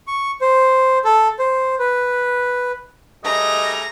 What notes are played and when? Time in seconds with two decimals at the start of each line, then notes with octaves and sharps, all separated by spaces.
0.07 C#6
0.41 C5
1.05 A4
1.39 C5
1.79 B4
3.24 G3 A3 G#4 D#5 A#5